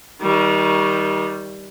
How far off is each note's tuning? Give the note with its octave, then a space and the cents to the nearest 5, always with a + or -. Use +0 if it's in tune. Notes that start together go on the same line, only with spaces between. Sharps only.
D#3 +25 G3 +0